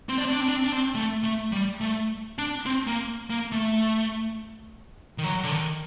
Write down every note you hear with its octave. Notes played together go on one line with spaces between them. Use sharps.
C4
D4
C4
D4
C4
D4
C4
D4
C4
A3
A3
G3
A3
D4
C4
A#3
A#3
A3
D#3
F#3
D3
D#3